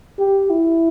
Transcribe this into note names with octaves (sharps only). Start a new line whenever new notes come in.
G4
E4